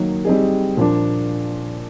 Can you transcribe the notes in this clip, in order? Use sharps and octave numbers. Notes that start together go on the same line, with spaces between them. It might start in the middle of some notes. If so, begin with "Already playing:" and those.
Already playing: D#3 F#3 A#3
G3 C4 D#4 G#4
A#2 F3 A#3 D4